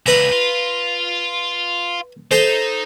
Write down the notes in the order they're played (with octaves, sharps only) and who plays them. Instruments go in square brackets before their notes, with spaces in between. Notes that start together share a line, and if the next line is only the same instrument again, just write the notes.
[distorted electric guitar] C#2 D3 [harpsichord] B4 A#5
[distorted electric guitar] F4
[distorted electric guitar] D#4 [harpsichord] A4 C5